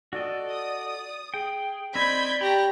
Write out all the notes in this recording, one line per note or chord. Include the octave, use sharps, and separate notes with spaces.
F#4 A4 D5 D#5
D#6
G#4 G5
C4 D5 D#5 B5 G6 G#6 B6
G4 C#5 A#5 B5 A#6